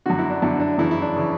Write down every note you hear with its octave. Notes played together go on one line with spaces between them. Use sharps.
F#2 D3 F#4
E4
D4
F#2 D3 E4
D4
F#2 C#3 E3 E4
E4
D4
C#3 E3